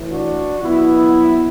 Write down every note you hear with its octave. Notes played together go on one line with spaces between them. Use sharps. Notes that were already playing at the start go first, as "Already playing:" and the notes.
Already playing: A2 E3
D4 F#4
B2 F#3 B3 E4